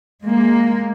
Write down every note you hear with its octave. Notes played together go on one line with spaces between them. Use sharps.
G#3 A#3